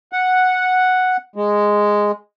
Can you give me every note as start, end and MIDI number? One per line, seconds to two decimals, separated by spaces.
0.12 1.17 78
1.36 2.12 56